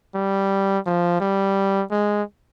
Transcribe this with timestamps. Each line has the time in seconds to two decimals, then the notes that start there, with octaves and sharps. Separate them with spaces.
0.15 G3
0.86 F3
1.20 G3
1.91 G#3